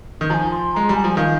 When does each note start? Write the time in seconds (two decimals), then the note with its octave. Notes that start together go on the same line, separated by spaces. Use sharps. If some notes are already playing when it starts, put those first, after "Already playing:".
0.21 D#3
0.29 F3 G#5 A#5
0.51 C6
0.74 G#3 A#5
0.89 G3
0.95 G#5
1.04 F3
1.17 D#3 F5